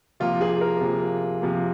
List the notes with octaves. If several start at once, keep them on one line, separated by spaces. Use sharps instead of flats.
C3 F3 A#3 F4
G#4
A#4
C3 F3 A#3
C3 F3 A#3